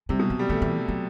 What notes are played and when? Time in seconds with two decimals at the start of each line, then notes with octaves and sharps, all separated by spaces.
0.09 C3 G3
0.19 B2
0.30 F#3
0.39 G3
0.49 E3 A3
0.62 E3
0.88 F#3